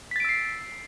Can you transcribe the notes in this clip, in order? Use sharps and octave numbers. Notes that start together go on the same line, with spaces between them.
E6 A6 B6 C7 D7